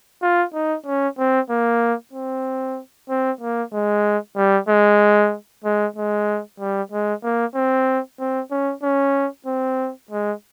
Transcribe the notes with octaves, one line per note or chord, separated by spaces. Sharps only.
F4
D#4
C#4
C4
A#3
C4
C4
A#3
G#3
G3
G#3
G#3
G#3
G3
G#3
A#3
C4
C4
C#4
C#4
C4
G#3